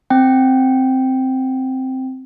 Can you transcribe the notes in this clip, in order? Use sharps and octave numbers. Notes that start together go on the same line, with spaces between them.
C4 G5